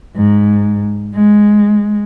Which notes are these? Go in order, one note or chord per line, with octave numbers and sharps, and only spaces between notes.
G#2
G#3